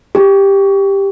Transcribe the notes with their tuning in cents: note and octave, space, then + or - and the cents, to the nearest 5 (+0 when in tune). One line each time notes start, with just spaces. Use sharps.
G4 +10